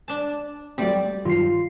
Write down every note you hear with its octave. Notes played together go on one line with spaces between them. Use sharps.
D4 A5
F#3 G3 A3 C4 D5
G2 D#3 F#3 F4 C7